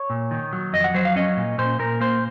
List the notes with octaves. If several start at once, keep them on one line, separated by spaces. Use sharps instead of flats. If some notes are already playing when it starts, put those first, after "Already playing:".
Already playing: C#5
A#2
D#3
F#3
F2 D#5
F#5
F#3 C5
F5
C#4 D#5
A#2
A#2 C5
A#2 A#4
A#3 C5